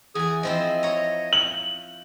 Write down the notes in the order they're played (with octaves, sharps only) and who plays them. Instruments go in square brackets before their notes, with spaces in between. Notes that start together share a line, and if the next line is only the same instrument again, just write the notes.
[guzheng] E2 G#5 [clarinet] G#4
[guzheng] F3 C4 E4 [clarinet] D#5
[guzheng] C#5 A#5
[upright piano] F#7